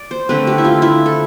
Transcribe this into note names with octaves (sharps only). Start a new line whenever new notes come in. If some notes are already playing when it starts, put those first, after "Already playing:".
Already playing: D5
C5
D3 A3 C4 B4
G4
E4
F4
E4
A4